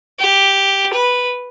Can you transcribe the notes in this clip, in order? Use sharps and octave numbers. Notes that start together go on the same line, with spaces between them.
G4
B4